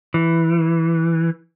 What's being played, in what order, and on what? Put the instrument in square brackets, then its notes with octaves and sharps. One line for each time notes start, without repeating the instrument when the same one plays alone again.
[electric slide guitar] E3